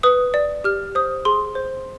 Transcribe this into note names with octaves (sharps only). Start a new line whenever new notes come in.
B4 D#6
D5
G4 F6
C5 D#6
G#4 C6
C5